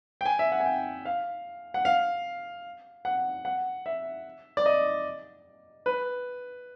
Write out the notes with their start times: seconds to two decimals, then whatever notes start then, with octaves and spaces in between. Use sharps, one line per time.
0.21 G5
0.26 G#5
0.39 E5
0.52 F#5
0.60 G#5
0.66 G5
1.05 F5
1.74 F#5
1.85 F5
3.05 F#5
3.45 F#5
3.86 E5
4.57 D5
4.66 D#5
5.86 B4